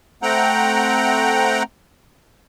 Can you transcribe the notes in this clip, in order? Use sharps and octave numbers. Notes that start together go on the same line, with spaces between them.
A3 C4 F#5 G5 A#5